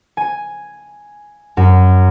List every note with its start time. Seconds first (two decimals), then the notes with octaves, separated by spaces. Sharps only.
0.17 G#5
1.57 F#2